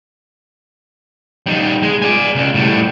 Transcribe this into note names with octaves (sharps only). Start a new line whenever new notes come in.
G3 D#4
G#3
D5 G#5
C#2
A2 G3